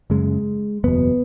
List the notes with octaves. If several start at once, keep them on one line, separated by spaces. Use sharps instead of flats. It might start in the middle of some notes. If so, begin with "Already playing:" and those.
F#1 F#2 C#3 G#3
F#1 E2 B2 B3